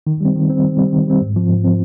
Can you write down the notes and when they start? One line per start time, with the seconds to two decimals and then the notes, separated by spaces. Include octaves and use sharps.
0.07 D#3
0.21 G3 C4
0.35 D#3
0.50 G3 C4
0.64 D#3
0.78 G3 C4
0.93 D#3
1.07 G3 C4
1.21 G#2
1.36 F3 C4
1.50 G#2
1.64 F3 C4